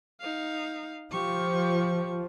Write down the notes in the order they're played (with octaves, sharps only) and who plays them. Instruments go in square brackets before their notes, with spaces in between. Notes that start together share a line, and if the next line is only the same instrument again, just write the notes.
[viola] D#4 F5
[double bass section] F3 [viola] G4 C#6